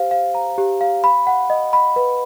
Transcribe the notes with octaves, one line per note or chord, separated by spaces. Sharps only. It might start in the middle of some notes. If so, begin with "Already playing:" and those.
Already playing: G4 C5 F5
F5
A#5
G4
F5
B5
F#5
D#5
B5
B4